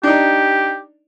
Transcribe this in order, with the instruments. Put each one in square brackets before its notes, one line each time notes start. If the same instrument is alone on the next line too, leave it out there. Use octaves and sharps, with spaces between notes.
[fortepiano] D4 D#4 [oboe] G4